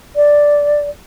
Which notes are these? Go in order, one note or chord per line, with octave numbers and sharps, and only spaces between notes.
D5